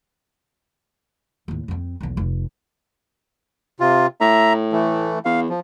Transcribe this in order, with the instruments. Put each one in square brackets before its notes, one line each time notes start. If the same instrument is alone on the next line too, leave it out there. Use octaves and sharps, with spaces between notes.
[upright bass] D#2 A2
F2 C4
B1 E2
F1
[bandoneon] C3 F4
[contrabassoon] A2 [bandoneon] E5 A#5
[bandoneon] E3 A3
[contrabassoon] E2 [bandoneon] F5
[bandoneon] F3